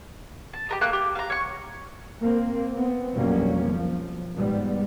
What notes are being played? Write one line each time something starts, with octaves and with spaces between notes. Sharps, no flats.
A5
G4 A#4 D#5
A3 A#3 F#6
G4
F5 A#5
C#5 C#6
A#3 C4
B3 C4
B1 F2 F#3 G3 A#3 C#4
F3
G#2 G3 B3